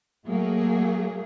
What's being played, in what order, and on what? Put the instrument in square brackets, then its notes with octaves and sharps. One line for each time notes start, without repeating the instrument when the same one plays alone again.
[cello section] F#3 A3 A#3 G#4